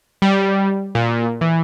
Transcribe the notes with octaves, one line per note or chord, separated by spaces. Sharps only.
G3
A#2
E3